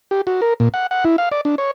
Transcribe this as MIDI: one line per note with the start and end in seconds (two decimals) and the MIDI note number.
0.11 0.21 67
0.27 0.41 66
0.42 0.54 70
0.60 0.69 46
0.74 0.87 78
0.91 1.04 78
1.05 1.16 64
1.18 1.29 77
1.32 1.41 74
1.45 1.55 62
1.58 1.71 73